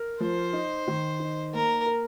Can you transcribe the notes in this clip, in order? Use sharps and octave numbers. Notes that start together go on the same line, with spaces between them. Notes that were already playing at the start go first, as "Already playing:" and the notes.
Already playing: A#4
F3 C5
D#4
D#3
D#4
A#3 A#4
A#4